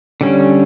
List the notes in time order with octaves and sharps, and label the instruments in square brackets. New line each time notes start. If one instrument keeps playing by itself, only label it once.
[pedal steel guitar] D3 G3 C#4